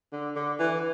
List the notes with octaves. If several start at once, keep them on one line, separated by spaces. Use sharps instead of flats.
D3
D3
E3